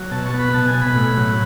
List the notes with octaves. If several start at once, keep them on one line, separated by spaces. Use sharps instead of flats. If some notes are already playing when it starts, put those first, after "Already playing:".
Already playing: F#3
B2 A5
C#6
B3
B5
B2 A5
G#5
B2
B5
A2
F#3